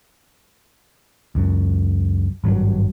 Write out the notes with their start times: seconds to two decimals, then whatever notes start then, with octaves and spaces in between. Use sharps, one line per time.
1.35 C#2 F#2
2.44 G#1 G2 D#3 F#3